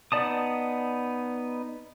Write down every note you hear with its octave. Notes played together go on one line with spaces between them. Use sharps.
B3 D#4 D5 A5 D#6